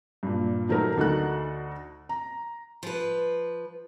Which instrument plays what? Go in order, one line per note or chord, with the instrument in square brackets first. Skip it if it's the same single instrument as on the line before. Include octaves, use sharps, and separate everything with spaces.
[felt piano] G2 A#2
D#3 F#3 A3 A#4
D2 D#4 F#4 A4 F#5 F#6
A#5
[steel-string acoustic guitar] F3 B4